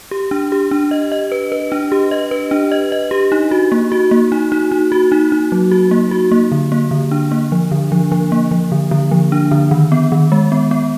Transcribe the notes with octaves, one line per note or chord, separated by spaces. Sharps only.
G4
D4
G4
D4
D#5
D#5
B4
B4
D4
G4
D#5
B4
D4
D#5
D#5
G4
D#4
F#4
A#3
F#4
A#3
D#4
D#4
D#4
F#4
D#4
D#4
F#3
F#4
A#3
F#4
A#3
D3
A#3
D3
D4
A#3
F3
D3
F3
F3
A#3
F3
D3
D3
F3
D4
D3
D#3
B3
D#3
G#3
B3
B3